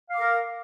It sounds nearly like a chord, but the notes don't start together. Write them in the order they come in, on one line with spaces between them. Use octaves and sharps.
F5 D6 A#4